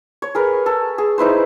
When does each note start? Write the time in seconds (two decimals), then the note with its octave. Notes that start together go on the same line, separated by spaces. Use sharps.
0.22 C#5
0.35 G#4 A#4 B4
0.66 A4
0.98 G#4
1.18 D#4 E4 B4 C5